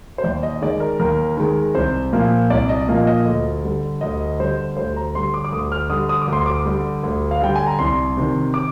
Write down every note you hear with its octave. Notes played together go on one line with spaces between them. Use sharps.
C5
D#2 D5
D#5
D#3 G#3 D5
A#4
D#2 A#4
D#3 G#3 A#4
C2 C5
A#2 F3 A#3
C2 D5
D#5
A#2 F3 A#3
D#5
D2
D3 G3
D2 D#5
D3 G3 C5
D2 C5
A#5
D3 G3 C6
D6
D6
D2 D#6
F6
D3 G3 D#6
D#6
D6
D2 C6
D6
D3 G3
D2
F5
D3 G3 G5
G#5
A#5
C2 C6
C3 D#3
D6